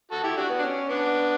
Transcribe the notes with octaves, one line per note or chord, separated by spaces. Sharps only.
F#4 A4
E4 G4
D4 F#4
B3
D4
C#4
B3 D4